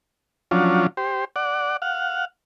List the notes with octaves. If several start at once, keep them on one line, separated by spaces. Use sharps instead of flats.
F3 F#3 C#4 D4 F4
G4 C5
D5 F#5
F5 F#5